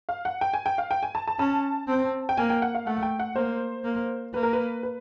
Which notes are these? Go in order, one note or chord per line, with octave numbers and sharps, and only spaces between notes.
F5
F#5
G5
G#5
G5
F5
G5
G#5
A5
A5
C#4 A5
C4
G5
A#3 G#5
G5
F#5
F5
A3 F#5
G5
F#5
A#3 C5
A#3
A#3 B4
A#4
B4
B4